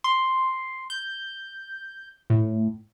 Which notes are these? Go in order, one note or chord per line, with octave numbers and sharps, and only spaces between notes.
C6
G6
A2